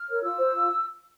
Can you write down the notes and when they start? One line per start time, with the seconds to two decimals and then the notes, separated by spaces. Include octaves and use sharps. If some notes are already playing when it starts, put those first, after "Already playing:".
Already playing: F6
0.09 A#4 C#5
0.23 F4 E6
0.37 C5
0.53 F4